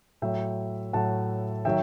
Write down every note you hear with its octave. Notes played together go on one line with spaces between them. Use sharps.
A2 F#3 E5 G5
A2 F#3 F#5 A5
D#3 F#3 E5 G5